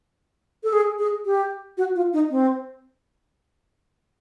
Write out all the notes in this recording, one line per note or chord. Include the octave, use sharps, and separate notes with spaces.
A4
G#4
G#4
G4
F#4
F4
D#4
C4